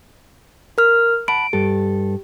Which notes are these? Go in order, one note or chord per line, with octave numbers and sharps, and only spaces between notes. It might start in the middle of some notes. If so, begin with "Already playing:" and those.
A#4 F6
F#5 A5 B5 D7
G2 G4 A4